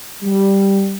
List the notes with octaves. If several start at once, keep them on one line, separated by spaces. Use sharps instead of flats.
G3